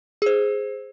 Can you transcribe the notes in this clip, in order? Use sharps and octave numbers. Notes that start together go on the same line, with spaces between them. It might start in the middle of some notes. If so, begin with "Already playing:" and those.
G#4 C5